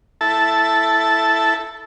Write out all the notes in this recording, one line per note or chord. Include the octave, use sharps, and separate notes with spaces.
E4 A4 A5